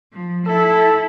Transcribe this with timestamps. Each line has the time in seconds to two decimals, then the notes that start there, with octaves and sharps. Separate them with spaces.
0.14 F3
0.46 E4 A4